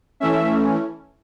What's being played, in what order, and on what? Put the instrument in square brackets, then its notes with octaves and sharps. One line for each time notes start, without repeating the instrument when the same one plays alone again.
[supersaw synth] E3 A3 C#4 E5